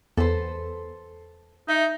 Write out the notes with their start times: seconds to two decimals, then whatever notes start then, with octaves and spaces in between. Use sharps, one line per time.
0.17 E2 A4 B4 C5
1.68 D#4 E5